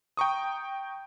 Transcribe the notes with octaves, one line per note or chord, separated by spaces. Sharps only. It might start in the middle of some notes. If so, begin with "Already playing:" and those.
G5 A#5 C#6 D#6